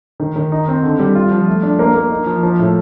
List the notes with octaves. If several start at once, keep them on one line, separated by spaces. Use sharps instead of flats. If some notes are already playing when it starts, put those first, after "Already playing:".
D#3
D#3
D#4
C4
D3
G3
F4
F3
A3
D4
A#3
A#3
D#4
F3
F3
A2